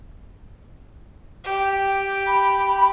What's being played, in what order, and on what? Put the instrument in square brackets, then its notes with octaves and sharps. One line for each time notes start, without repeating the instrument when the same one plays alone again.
[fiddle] G4
[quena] B5